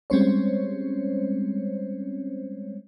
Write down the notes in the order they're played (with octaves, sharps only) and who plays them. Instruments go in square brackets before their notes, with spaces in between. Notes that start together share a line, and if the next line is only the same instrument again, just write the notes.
[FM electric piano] G3 G#3 C4 C#4 C5 C#5